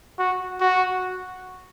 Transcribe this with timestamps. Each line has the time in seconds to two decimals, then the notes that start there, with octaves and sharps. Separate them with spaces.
0.19 F#4
0.61 F#4